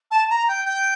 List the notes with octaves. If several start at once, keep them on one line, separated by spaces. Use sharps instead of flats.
A5
A#5
G5
G5